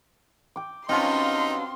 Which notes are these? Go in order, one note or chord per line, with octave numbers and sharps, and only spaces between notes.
G5 D6
G2 F#3 C4 C#4 D#4 F4 C6